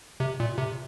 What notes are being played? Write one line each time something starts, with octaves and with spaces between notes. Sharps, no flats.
C3
A#2
C3